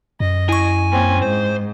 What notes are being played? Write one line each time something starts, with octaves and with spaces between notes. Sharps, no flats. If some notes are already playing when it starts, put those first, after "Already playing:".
F#2 D#5
E4 G#5 C#6
A#3 C4 C#4
G#2 C5